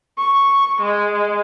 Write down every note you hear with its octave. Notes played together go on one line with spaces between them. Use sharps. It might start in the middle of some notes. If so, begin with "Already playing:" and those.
C#6
G#3